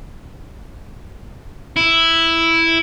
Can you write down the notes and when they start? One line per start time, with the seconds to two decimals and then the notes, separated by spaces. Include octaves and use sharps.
1.76 E4